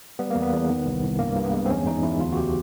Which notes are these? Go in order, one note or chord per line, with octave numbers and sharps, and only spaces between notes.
G3 B3
A#3
E2
B3
E2
D#3
C2
C2
G2 A#3
G2
B3
G#3
C4
E2 C#4
E2 D#4
E2 E4
D2 F4
F#4
C#3 G4